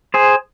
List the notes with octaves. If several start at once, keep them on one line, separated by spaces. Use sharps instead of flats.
G#4 C5